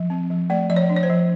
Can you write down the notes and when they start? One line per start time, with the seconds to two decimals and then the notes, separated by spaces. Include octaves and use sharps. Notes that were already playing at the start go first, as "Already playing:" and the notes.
Already playing: F3
0.10 C4
0.30 F3
0.50 A3 D5
0.70 F3 D5
0.76 C#5
0.90 D4
0.96 C#5
1.03 C5
1.10 F3